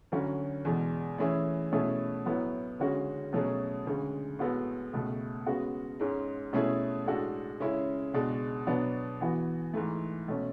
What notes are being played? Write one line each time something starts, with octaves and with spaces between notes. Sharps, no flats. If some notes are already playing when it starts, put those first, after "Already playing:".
D2 D3 F#3 C#4 F#4
E2 B2 G#3
E3 A3 C#4 E4 G#4
B2 A3 C#4 E4 G#4
A2 F#3 B3 E4
D2 C#3 G#3 C#4 F#4
B2 F#3 A3 C#4 G#4
D2 C#3 G#3
A2 G#3 B3 F#4 A4
C#2 B2 A3
C#3 G#3 B3 F#4
G#2 G#3 C#4
B2 A3 C#4 E4 G#4
A2 G#3 D4 F#4 A4
C#3 G#3 C#4 E4
C#2 B2 G#3 D4
B2 F#3 B3 D4
E3 B3 F#4
G#2 E3 A3
B2 A3 C#4